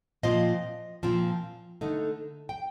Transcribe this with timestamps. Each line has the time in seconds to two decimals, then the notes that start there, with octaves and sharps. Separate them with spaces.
0.23 A#2 F3 C4 F4 C5 D#5
1.03 A#2 F3 C4 F4
1.81 D3 A3 D#4
2.49 G5